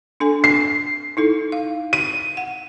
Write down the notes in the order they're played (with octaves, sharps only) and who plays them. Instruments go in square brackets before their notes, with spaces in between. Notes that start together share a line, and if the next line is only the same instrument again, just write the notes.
[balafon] D4 A4 G#5
[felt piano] C7
[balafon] D#4 E4 A4
F5
[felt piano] D#7
[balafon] F#5